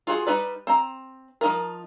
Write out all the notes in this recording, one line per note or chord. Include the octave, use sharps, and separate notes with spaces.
F4 F#4 G#4
G3 D#4 B4 D5
C4 A#5
F3 D#4 A#4